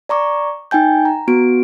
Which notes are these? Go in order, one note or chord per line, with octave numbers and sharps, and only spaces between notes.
D5 A#5 C#6 D6
D#4 G5 G#5 G6
A#5
B3 F#4 D7